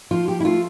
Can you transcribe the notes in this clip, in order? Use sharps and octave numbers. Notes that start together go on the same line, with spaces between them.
F3 F4
G4
E4
A3 F4